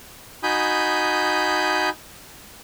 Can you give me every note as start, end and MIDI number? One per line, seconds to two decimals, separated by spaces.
0.43 1.89 63
0.43 1.89 66
0.43 1.89 80
0.43 1.89 83
0.43 1.89 87
0.43 1.89 91